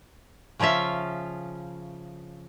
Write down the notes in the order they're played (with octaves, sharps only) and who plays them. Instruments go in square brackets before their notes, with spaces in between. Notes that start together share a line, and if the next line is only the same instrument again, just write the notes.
[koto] C#3 F3 C#4 F4 E5